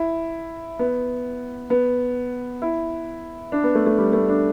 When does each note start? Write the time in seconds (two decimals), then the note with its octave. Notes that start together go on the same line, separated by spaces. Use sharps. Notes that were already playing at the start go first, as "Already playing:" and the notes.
Already playing: E4
0.79 B3
1.70 B3
2.62 E4
3.52 D4
3.64 B3
3.75 A3
3.86 A3
3.98 G3
4.13 A3
4.29 D4